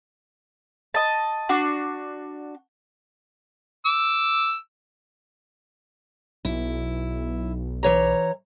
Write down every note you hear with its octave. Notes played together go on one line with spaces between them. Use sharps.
D#5 A5
D4 F#4
D6 E6
B1 E4
E3 C#5 A#5